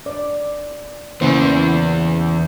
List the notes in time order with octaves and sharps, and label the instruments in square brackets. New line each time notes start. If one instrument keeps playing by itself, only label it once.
[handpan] D5
[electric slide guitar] E2 E3 [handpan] C#3 A#3 C5